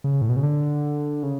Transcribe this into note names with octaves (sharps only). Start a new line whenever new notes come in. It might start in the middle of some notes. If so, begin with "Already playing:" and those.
C#3
A2
B2
C#3
D3
C#3